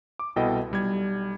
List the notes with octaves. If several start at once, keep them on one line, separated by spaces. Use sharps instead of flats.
D6
C2 B2 E4 A4 D#5 G5
B1 G3 G#6